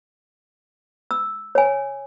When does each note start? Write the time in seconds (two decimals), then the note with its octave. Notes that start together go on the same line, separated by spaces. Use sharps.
1.11 E6
1.55 C#5 G#5